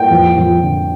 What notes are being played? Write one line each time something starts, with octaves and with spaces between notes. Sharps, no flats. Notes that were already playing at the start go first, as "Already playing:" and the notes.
Already playing: A#3 G5
F2
F2
D3